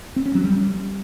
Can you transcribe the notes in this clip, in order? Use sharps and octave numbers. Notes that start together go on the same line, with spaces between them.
C4
C#4
F#3
G3